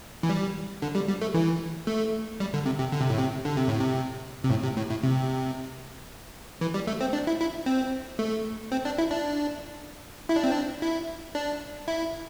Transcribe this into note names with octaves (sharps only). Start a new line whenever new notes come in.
E3
G3
D3
G3
G3
A3
E3
A3
G3
D3
C3
C3
D3
C3
A2
C3
D3
C3
A2
C3
C3
A2
C3
A2
A2
C3
E3
G3
A3
C4
D4
E4
E4
C4
A3
C4
D4
E4
D4
E4
D4
C4
D4
E4
D4
E4